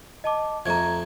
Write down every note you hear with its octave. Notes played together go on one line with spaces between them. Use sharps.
D#5 A5 D6
F2 A3 A#5 G#6